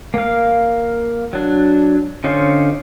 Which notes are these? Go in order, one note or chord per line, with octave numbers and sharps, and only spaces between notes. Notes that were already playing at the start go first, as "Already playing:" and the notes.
A#3 F5
F#3 D4
D3 C#4 D#4 F4 C5